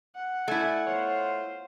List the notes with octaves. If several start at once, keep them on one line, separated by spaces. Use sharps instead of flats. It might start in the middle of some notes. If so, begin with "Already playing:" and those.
F#5
A3 E4 D5 G#5
B3 F4 C5 C#5